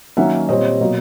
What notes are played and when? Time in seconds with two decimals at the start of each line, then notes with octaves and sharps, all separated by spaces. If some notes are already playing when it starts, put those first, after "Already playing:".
0.17 D#3 F#3 A#3 C#4 E5 F#5
0.49 A#2 G3 C4 C#5 D#5
0.80 B2 F#3 A#3